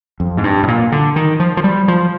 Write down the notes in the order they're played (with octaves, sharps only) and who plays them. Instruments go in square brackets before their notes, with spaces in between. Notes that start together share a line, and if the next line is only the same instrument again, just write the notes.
[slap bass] F2
G#2
G2
G#2
A#2
D3
D#3
F3
F3
G3
F3